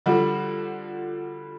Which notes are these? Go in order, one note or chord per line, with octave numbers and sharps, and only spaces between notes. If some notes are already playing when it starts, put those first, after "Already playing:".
D3 F3 G3 F#4